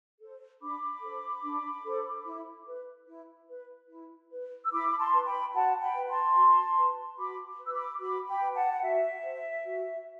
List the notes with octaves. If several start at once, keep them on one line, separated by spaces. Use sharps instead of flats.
A4 C5
D4 B5 D6
A4 C5
D4
A4 C5
E4
B4
E4
B4
E4
B4
E6
E4 B5 D6
B5
A5 C6
B4
G5 B5
F#4 F#5 A5
G5 B5
B4
A5 C6
F#4
B4
F#4 B5 D6
B4
E6
B5 D6
F#4 B5 D6
G5 B5
B4
F#5 A5
F#5
F#4 E5
C5
F#4